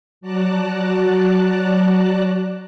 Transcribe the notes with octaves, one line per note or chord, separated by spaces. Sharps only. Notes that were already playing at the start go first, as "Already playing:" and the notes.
F#3 F#4 D5 A5 A#5 F#6